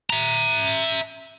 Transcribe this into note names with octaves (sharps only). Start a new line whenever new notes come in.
E5 A#5